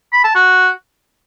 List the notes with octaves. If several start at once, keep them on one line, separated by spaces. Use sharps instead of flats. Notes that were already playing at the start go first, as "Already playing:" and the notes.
B5
A5
F#4